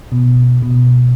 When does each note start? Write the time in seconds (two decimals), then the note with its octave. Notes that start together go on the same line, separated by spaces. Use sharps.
0.12 B2
0.62 B2